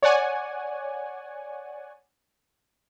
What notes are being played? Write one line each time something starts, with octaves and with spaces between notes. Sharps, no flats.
C#5 D5 F#5 G#5